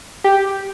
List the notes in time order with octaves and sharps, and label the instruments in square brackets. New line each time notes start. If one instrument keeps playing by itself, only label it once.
[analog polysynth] G4